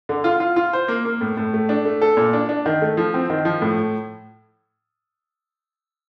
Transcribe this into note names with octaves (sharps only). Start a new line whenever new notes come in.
D3
F4
F4
F4
C5
A#3
A#3
A2
A2
A3
D4
A3
A4
A#2
D4
D4
D#3
A3
F3
C4
D#3
F3
A2